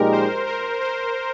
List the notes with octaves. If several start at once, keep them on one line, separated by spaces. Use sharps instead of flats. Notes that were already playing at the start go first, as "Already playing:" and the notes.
Already playing: A#2 F3 G#3 D#4 G4 A#4
C5
A#4
C5